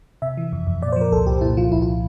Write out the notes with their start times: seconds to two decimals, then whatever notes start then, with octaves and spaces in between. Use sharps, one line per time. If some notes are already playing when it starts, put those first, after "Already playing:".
0.22 C3 E5
0.37 E3
0.53 F2
0.67 F2
0.82 A#2 D5
0.92 C5
0.96 F3 A#4
1.12 C2 A4
1.26 C2 G4
1.41 A#2 E4
1.57 F3 F4
1.72 C2 E4
1.82 F4